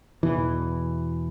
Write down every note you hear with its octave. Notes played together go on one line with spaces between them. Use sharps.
E2 B2 E3